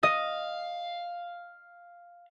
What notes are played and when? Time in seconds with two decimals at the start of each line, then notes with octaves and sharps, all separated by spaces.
0.03 D#5 F5